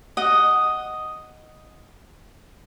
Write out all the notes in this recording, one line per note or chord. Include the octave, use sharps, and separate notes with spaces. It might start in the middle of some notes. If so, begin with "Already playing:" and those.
D#5 F#5